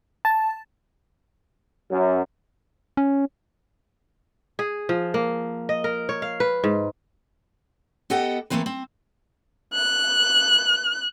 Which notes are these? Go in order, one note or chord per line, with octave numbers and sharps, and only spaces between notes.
A5
F#2
C#4
G#4
F3
A#3
D#5
A#4
C#5
F5
B4
G#2
B3 G4 A4 D#5 F#5 G5
E3 F3 A3 A#3 C4 B4
C4
F#6